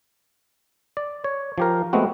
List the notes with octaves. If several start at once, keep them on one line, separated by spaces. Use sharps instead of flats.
D5
C#5
F3 G4 A#4
G#3 A3 B3 C4 F#4